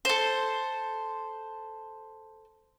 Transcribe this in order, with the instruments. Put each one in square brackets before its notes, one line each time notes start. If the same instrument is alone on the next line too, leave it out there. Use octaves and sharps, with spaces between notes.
[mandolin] A4 C5